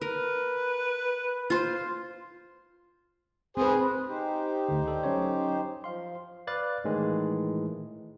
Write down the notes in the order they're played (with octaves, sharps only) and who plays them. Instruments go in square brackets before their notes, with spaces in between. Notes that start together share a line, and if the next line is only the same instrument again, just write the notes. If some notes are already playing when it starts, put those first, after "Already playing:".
[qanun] A#4 [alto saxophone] B4
[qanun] F4 C5
[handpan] C4 B4 [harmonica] G#4 C5
[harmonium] D#4 G4 C5
[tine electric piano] D2 D3
A4 D5
F#3 C#4 C#5
[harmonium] F3 [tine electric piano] F5 C6
[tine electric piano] B4 D5 F5 F#6 A6
A2 D#3 E3 G#3